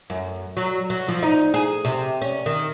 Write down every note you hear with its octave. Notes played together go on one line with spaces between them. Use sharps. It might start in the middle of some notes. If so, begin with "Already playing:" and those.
F#2
F#3
F#3
F3
D#4
G#4
C3
C#4
D#3